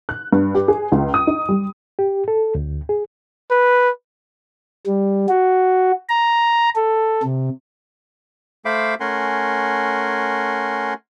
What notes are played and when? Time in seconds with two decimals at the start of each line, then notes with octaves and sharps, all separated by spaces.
0.09 F#6
0.33 G2
0.55 G4
0.68 G#4
0.92 C#2
1.14 D#6
1.27 D#4
1.49 G3
1.99 G4
2.28 A4
2.55 D2
2.89 G#4
3.51 B4
4.87 G3
5.29 F#4
6.09 A#5
6.75 A4
7.23 C3
8.65 A3 C5 E5 F5 B5 D6
9.00 A3 C#4 A#4 F#5 G#5 C6